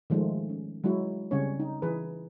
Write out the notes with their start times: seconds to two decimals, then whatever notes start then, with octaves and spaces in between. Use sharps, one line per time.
0.10 D#3 F3 G#3 A3
0.49 C#4
0.84 F#3 G#3 E4 F#4
1.31 C#3 G3 C4 C#4 C#5
1.60 D#4
1.82 E3 G#4 B4